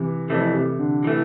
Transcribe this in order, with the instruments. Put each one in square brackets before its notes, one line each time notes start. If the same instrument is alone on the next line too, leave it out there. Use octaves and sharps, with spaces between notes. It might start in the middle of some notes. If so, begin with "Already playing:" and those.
Already playing: [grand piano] C3 E3
[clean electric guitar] F2 E3 A3 [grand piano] C3
[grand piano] C3
D3
[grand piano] C3 [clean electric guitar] E3 A3